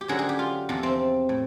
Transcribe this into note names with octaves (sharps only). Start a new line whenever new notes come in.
G4
F#2 D3 F#3 G#4
G#4
G4
F4
E2 C3 F3
C4
A2